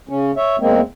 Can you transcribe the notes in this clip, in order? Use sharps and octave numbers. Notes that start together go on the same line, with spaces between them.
C#3 C#4
C#5 E5
E2 G#3 A#3 C4